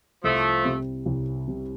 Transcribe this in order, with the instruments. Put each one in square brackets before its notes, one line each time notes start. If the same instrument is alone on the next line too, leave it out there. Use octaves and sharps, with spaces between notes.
[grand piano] C2 [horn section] F3 A3
[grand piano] C3 G3
C2
C3 G3